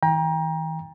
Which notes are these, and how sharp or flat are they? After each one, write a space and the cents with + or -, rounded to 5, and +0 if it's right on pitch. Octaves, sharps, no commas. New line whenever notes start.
E3 -40 G5 +30 A#5 +25